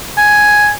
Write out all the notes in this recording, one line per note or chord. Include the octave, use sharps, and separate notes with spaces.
G#5